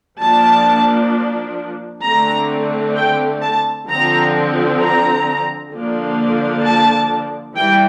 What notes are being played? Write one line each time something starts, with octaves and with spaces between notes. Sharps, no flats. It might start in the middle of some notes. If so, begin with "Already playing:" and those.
F3 A#3 D4 A5
D3 A3 C4 A#5
G5
A5
D3 F3 C4 A#5
A#5
D3 F3 A#3 D4
A5
E3 G3 G5